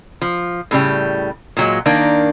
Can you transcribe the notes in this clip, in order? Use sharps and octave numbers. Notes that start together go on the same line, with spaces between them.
F3
A2 C#3 G3
A#2 F#3 G#3
D#3 A#3 D4